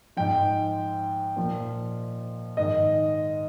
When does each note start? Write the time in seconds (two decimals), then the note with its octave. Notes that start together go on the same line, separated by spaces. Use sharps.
0.17 G#2 F3 G5
1.36 A#2 F3
2.57 G#2 D#3 D#5